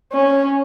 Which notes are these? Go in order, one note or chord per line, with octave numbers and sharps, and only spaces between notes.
C#4